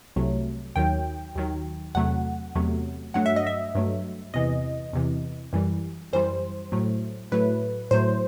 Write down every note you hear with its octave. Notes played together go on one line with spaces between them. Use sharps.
C2 C3 F#3 A3
D#2 D#3 F#3 G5
D#2 D#3 F#3
E2 C3 F#3 A3 F#5
E2 C3 F#3 A3
G2 F#3 A3 F#5
E5
D#5
E5
G2 F#3 A3
E2 C3 E3 D#5
E2 C3 E3
F#2 E3 G3
F#2 E3 G3 C5
A2 F#3 A3
A2 F#3 A3 B4
A2 F#3 A3 C5